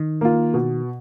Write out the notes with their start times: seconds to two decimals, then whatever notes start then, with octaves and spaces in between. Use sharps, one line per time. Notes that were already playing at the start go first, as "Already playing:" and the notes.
Already playing: D#3
0.21 A#3 F4
0.54 B2